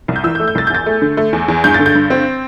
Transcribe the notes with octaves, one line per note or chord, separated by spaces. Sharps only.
C2
G6
E3 E6
G6
A3
G6
C2 A6
G6
E2 A6
A3
D3
A3
E2
E2
G2 G6
A6
D3
G6
G2
C4